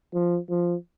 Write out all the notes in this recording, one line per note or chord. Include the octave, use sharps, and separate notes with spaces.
F3
F3